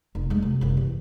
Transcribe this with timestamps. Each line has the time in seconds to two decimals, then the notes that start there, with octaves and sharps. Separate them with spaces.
0.15 F1
0.30 G#3 A3
0.42 F#2 C3
0.61 F#1 C2
0.77 E3